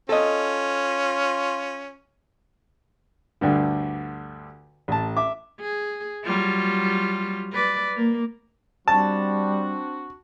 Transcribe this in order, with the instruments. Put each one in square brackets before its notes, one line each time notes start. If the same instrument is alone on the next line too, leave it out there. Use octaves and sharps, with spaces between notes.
[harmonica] C#4 F4 [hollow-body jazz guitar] A4 D#5
[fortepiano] D2 G2 D3
A1 A5
E5 D6
[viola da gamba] G#4
F#3 G3 F4
B4 D5
A#3
[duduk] G3 [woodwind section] C4 D4 F#4 [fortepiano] A5